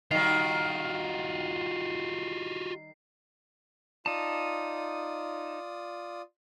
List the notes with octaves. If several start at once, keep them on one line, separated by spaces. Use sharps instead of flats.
D#3 G3 F4 F#4 C7
D#4 F4 D5 A5 D#6